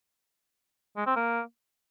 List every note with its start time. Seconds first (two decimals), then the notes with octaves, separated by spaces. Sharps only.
0.97 G#3
1.06 C4
1.16 A#3